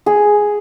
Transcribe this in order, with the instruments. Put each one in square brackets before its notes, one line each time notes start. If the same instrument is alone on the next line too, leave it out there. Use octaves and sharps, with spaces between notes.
[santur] G#4